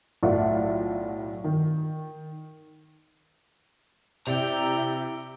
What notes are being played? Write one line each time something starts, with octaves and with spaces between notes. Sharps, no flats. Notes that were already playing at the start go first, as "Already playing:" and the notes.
B1 A2 F4 D5 E5 F#5
D#3
C3 E4 D5 G5 A#5